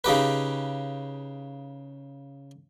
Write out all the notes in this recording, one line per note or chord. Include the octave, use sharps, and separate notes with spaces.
C#3 D#4 G4 B4